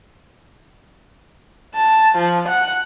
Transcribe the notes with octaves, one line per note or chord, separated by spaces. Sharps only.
A5
F3
F#5